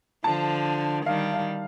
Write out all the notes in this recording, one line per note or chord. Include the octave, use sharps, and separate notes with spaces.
D3 F3 A5
D#3 G3 F5
F5